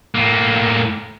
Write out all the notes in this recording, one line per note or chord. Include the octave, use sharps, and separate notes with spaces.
A2 A#3